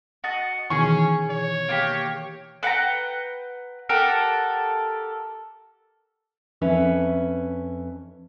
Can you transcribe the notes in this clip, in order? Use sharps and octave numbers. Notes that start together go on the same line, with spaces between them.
F#4 D#5 A5
B2 D#3 E3 C#4 G#4 C#6
C#5
A#3 F4 G4
B4 F#5 G5 A#5
G4 A4 A#4 F#5
F2 C#4 B4 E5